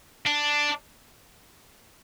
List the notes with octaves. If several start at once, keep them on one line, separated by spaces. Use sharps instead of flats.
D4